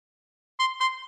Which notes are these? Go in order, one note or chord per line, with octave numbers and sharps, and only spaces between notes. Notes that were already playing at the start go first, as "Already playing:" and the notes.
C6
C6